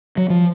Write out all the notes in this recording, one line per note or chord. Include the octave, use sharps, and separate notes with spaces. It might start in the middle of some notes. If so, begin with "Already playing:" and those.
F#3
F3